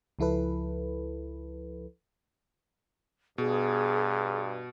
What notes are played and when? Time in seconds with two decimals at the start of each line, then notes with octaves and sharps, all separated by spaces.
0.19 C#2 F3 E4 A4 B4
3.38 G2 B2 G#4